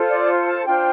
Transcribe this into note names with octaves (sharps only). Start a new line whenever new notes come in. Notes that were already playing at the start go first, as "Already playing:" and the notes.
Already playing: F4 A4 C5
D5
A5
D4 F4 C5 G5